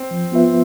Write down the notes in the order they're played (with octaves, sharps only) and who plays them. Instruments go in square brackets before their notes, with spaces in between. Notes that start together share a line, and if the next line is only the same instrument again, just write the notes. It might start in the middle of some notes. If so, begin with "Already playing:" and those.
Already playing: [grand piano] C4
[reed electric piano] F3
B3 F4 B4 E5